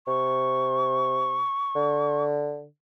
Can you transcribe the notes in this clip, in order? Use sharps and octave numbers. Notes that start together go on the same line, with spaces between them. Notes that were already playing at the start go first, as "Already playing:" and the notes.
C3 C#6
D3